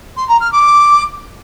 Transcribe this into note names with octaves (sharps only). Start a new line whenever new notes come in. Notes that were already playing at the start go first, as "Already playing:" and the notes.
C6
A#5
F6
D6